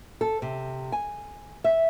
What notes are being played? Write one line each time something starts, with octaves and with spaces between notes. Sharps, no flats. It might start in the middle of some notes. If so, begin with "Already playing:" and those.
A4
C3
G#5
E5